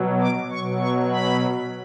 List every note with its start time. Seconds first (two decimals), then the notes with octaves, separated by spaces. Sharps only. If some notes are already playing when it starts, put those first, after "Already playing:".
Already playing: B2 F#3
0.21 D6
0.51 B2 F#3 C#6
0.81 C#6
1.10 B5